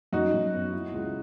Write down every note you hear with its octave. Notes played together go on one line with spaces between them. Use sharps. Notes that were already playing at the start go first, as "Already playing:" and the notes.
F#2 D#4 F#4
F#2
B3
E4
C#2